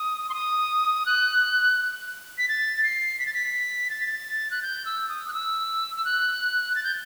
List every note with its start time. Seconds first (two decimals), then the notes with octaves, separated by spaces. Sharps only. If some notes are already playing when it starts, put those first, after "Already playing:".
Already playing: D#6
0.29 C6
0.34 D#6
1.06 F#6
2.38 B6
2.48 A6
2.83 C7
3.19 B6
3.26 A6
3.34 B6
3.90 A6
4.51 F#6
4.62 G6
4.85 E6
5.09 D#6
5.28 F#6
5.33 E6
5.96 E6
6.05 F#6
6.75 A6
6.84 G6